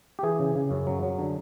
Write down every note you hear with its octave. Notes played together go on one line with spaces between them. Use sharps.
G4
E3 G#4
C#3
C#3
F#2
F#3
F#3
D3